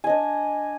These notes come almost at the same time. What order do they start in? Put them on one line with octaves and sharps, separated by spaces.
G#5 D#5 D4